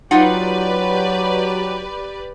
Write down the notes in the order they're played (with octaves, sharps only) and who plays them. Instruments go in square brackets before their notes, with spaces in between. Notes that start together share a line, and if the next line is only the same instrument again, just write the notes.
[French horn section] F#3 [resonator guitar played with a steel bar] D#4 F4 F#5 [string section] G4 B4 D5